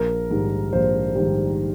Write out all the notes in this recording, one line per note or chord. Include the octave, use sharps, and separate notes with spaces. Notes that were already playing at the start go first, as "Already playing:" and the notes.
Already playing: A#1 A#4
G#2 D#3 G3
A#1 C5
G#2 D#3 G3